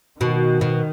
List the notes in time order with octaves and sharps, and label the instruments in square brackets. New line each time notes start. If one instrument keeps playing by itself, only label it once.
[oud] B2 [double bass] D#3
[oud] B2